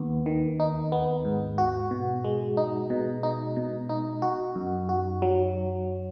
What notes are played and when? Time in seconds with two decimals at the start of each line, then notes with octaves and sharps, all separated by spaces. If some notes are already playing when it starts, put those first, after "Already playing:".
Already playing: D#2 B3
0.26 D#3
0.60 D#4
0.92 B3
1.25 G#2
1.58 F#4
1.91 B2
2.24 G#3
2.57 D#4
2.90 B2
3.23 D#4
3.56 B2
3.89 D#4
4.22 F#4
4.56 F#2
4.89 F#4
5.22 F#3